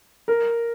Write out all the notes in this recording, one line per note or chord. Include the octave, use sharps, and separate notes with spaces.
A#4